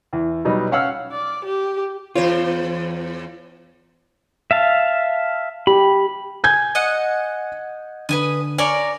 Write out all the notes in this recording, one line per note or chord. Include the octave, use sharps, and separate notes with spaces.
E2
B2 F#3 G3 D#4
C#4 F5 F#5 E6 F6
D5
G4
E2 F4 C5 C#5
E5 F5 A5
G4 B5
G#5 G6 G#6
D#5 F#5
D3 B4 G#5 D#6
A#4 C#5 D5 G#5